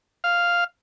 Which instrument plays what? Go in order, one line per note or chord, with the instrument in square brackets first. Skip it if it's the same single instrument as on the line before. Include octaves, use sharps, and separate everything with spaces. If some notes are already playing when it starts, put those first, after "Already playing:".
[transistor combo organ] F5